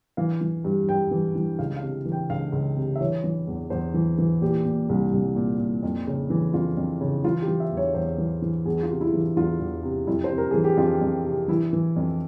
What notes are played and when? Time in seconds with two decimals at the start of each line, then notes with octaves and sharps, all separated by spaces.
0.17 E3 F5
0.41 E3
0.65 G2
0.89 G2 G5
1.11 E3
1.36 E3
1.59 C#2 F5
1.76 F5
1.82 C3
2.05 E3
2.12 G5
2.29 C#2 F5
2.52 C#2
2.77 C3
2.96 E5
3.01 E3 C#5
3.24 E3
3.47 E2
3.70 E2 C5
3.94 E3
4.18 E3
4.41 A#2 G4
4.65 A#2
4.89 C2
5.13 C2
5.36 A#2
5.59 A#2
5.83 F2
6.07 C#3
6.30 E3
6.53 F2 F4
6.77 F2
7.01 C#3
7.24 E3 F4
7.42 G4
7.48 E3
7.60 E5
7.71 E2
7.77 C#5
7.95 E2 C5
8.18 E3
8.42 E3
8.65 E2 G#4
8.83 F4
8.89 C3
9.01 E4
9.14 E3
9.19 F4
9.36 E2 F4
9.60 E2
9.83 C3
10.07 F2 E4
10.24 C5
10.31 C3
10.38 A#4
10.51 E3 G#4
10.64 G4
10.77 F2 F4
11.01 F2
11.25 C3
11.48 E3 E4
11.73 E3
11.96 F2